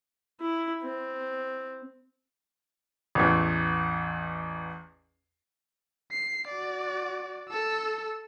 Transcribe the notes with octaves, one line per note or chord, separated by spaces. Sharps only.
E4
C4
A1 E2
C7
F#4 D5
A4 E6